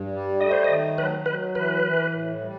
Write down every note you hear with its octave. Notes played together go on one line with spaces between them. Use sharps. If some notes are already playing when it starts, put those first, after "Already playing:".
Already playing: G2
G3
A3 D#5
C5
D#3 D#5
F#3 B4
F#3 B4
E3 B4
E3
A2
G3